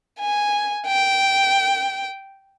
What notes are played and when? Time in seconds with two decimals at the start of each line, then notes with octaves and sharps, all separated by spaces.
0.20 G#5
0.87 G5